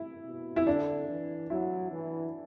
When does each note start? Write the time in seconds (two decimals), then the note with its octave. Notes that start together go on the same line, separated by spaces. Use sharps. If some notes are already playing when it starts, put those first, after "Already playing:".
Already playing: E4
0.25 B2
0.56 E4
0.67 D3 D4
1.08 E3
1.50 F#3 E4
1.92 E3